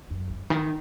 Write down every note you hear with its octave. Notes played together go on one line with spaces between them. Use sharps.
F#2
G2
D#3